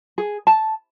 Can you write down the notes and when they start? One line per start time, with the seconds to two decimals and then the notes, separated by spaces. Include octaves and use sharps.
0.18 G#4
0.47 A5